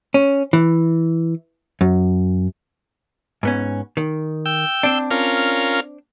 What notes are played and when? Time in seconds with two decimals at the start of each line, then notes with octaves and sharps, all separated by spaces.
0.14 C#4
0.53 E3
1.81 F#2
3.43 G#2 B3 C#4
3.97 D#3
4.46 G5 E6
4.83 C4 D4
5.11 C#4 F4 A#4